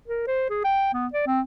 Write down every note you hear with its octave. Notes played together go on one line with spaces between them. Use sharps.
A#4
C5
G#4
G5
B3
D5
C4